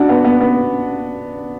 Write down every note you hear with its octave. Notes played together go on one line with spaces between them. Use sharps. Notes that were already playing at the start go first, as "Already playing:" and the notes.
Already playing: D4 F#4
B3
B3
B3